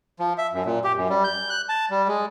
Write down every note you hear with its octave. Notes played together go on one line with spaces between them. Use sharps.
F3
E5
F#2
A#2
G4
F#2
G3
G6
F#6
A5
G3
G#3